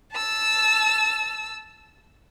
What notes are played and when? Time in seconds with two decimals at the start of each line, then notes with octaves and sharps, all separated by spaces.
0.13 A5 E6